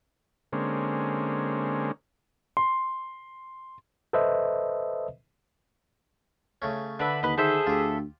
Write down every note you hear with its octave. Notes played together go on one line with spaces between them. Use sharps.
D3 G#3 A#3 C4 C#4
C6
A4 B4 C5 D#5 E5
C#3 A3 C#4
D3 D4 B4 E5
D#2 B4 D#5
D#3 G#4 A4 C5 E5
D2 F4 G4